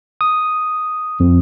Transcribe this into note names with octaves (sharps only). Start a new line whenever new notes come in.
D#6
F2